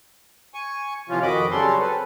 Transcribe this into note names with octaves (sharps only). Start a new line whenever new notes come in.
G#5 C#6
C3 E3 F3 C#4 F4
F2 D#3 F#4 D#5 B5 D6
C#3 F#3 G3 C#4 A4 C6
C4 A4 B4